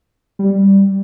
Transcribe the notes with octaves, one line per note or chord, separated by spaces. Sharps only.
G3